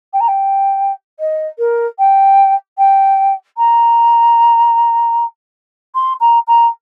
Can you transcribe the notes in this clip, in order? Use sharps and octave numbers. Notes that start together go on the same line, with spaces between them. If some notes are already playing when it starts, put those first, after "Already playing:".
G5
A#5
G5
D#5
A#4
G5
G5
A#5
C6
A#5
A#5